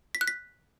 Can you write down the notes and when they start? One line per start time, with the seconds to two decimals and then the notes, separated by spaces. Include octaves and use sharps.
0.15 B6
0.21 F#6
0.28 B6